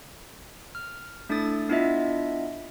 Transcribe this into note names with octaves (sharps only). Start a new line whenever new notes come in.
F6
A3 D4 E4 A4 D#6 A6
B3 D4 E4 F4 D#5 E5